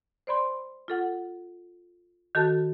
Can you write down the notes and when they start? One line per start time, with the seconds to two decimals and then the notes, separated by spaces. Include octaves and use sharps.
0.27 C5 D5 B5 C6
0.88 F4 A4 F#5
2.35 D#3 F#4 A4 A5